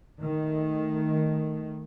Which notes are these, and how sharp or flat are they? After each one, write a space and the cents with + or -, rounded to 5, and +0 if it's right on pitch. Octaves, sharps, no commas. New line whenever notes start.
D#3 +0 A3 +5